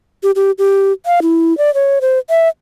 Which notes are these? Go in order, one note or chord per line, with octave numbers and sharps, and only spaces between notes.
G4
G4
G4
F5
E4
D5
C#5
C5
E5